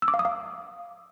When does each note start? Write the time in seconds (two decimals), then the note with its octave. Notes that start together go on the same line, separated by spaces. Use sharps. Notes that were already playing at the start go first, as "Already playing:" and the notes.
0.02 E6
0.08 D6
0.14 F5
0.19 D#6
0.25 F5